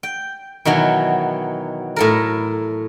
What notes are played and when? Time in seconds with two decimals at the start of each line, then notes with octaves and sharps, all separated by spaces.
0.03 G5
0.65 B2 D#3 E3 F#3
1.96 A2 A4 A#4